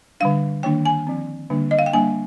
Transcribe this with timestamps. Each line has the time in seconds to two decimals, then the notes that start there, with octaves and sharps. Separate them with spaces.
0.20 D3 G3 D4 F5
0.63 D#3 A#3 D4 G5
0.85 G#5
1.07 F3 C4
1.50 D3 G3 A#3 D4
1.71 D#5
1.79 F5
1.86 G5
1.93 G3 A#3 D4 G#5